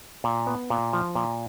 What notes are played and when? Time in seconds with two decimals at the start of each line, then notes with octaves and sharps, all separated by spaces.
0.24 A#2
0.47 B3
0.70 A#2
0.93 F3
1.15 A#2